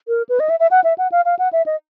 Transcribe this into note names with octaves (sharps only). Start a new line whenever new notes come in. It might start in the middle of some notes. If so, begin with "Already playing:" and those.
A#4
B4
D#5
E5
E5
F#5
E5
F#5
F5
F5
F#5
E5
D#5